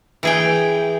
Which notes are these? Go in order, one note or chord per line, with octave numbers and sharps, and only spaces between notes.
E3 G#4 G5